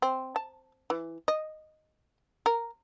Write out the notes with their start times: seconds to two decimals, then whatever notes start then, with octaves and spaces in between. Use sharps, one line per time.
0.02 C4
0.36 A5
0.90 E3
1.28 D#5
2.46 A#4